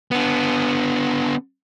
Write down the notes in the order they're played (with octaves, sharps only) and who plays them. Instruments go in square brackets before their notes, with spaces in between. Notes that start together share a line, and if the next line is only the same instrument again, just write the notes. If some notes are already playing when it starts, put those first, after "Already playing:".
[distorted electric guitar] D3 B3